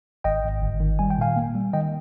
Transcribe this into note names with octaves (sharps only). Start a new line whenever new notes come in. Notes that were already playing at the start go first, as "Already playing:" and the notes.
G#1 D#5 G5
G#1
G1
D#3
G3 G#5
G5
A#2 F5 G#5
A#3
G3
D#3 D#5 G5